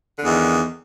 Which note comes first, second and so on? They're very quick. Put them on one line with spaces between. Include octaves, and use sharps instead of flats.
D3 E2 D#3